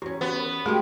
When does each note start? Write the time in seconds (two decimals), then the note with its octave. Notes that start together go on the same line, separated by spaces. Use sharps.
0.02 E2 C#4 E4 F#4 G4
0.21 B3 F#4 G4
0.36 G4 A#4
0.66 G#3 A3 F#4 G4 A#4 A5 C6